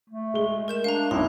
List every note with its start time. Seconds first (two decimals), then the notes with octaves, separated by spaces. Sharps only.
0.10 A3
0.34 G#3 G7
0.68 A#4 G6 E7
0.84 D4 F5 A#5
1.11 B1 F#2 E4 C6